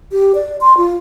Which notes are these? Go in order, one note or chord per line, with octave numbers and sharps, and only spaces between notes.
G4
D5
C6
F4